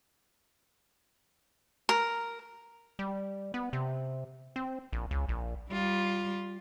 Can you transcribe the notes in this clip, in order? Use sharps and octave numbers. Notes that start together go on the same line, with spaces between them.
A#4
G3
B3
C3
C4
A#1
C#2
A#1
G3 F4